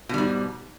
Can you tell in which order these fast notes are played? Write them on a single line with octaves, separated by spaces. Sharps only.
B2 G3 G#2